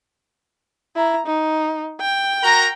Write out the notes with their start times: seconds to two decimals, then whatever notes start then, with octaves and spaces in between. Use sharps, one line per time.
0.96 E4 A#5
1.26 D#4
2.01 G5
2.43 F#4 A#4 A#5